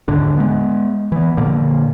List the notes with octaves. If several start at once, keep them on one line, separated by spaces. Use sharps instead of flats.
D#2 G#2 D3 D4
G#3 B3
E3 B3
A#2 D3 F3 A#3